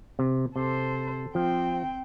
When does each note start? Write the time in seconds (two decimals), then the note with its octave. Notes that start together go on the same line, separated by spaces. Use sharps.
0.19 C3
0.56 C3 A4 C5
1.35 F3 C4 G5